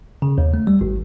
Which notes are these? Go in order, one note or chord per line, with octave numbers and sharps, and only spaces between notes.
C#3
D#2
A3
G3
G#1